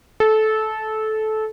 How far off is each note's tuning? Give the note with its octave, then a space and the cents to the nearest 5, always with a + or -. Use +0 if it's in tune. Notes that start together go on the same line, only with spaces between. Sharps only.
A4 -20